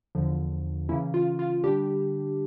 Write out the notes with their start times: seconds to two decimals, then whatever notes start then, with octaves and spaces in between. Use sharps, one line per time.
0.15 E2 D3 F3
0.89 C#3 E3 A#3 C#4 E4
1.14 F4
1.39 F4
1.64 D3 G3 D4 G4